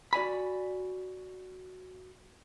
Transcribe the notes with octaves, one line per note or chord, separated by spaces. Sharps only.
F#4 D5 G#5 B5